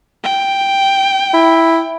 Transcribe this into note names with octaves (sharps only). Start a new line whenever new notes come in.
G5
E4